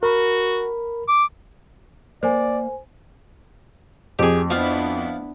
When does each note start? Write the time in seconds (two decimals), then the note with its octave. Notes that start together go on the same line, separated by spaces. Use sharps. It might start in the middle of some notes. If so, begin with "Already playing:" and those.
0.03 F#4 A#4 B5
1.08 D6
2.23 A#3 C5 D5 G#5
4.19 F2 G4 G#4
4.50 F3 B3 D4 E4 F4